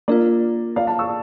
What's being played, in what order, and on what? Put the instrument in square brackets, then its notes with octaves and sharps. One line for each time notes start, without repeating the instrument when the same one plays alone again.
[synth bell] A#3 D4 F4 [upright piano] A#4 D5
[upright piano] D5 F5
F5 A5
C#6 E6